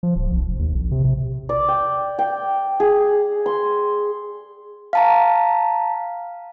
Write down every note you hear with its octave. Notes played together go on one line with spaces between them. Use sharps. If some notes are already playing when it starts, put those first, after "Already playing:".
F3
D1
B1
F1
D#2
A#1
C3
C3
D5
G5
G5
G#4
C6
F5 A5 A#5